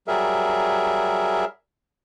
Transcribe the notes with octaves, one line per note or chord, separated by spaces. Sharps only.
F#3 G3 G#4 A#4 E5